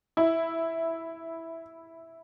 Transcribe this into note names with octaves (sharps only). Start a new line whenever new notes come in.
E4